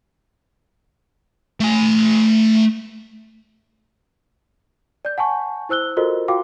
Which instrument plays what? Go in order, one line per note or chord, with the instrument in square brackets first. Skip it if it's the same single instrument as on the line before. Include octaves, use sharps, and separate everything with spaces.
[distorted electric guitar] A3 G#5
[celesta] D5 G6
F#5 G#5 A5 C#6
E4 C5 E6 F#6 G7
F4 F#4 A4 A#4 C5 D#5
F4 F#4 F5 G5 D6